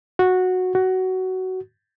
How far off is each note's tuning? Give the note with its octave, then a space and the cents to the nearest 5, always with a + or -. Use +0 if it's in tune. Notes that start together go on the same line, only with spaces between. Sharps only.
F#4 -10
F#4 +15